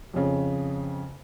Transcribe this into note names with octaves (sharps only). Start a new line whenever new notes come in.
F2 C#3